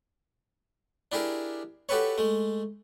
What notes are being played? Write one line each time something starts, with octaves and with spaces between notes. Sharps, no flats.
D4 E4 G4 G#4 A#4
F#4 G4 A4 B4 C#5
G#3 A3